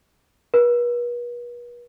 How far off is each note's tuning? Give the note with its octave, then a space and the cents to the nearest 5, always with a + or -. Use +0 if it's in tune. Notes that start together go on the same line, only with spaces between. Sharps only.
B4 -40